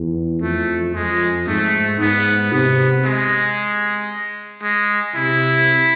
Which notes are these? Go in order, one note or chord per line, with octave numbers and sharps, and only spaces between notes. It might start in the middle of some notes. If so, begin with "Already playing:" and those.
Already playing: E2
F2 A3
F2 G#3
G#2 A3
G#2 B3
C3 B3
G#3
G#3
C3 E4